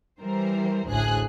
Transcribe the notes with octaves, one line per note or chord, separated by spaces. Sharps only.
E3 G3 A#4 C5
A1 D2 A2 G#4 F#6